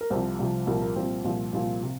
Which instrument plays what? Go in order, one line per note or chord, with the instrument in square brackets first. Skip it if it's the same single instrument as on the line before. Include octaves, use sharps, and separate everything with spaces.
[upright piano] A#4
C2 C3 F3 C5
C2 C3 F3
C2 A#2 F3 A#4
A#3
C2 A#2 F3 C4
C2 A#2 F3
C2 A#2 F3
C3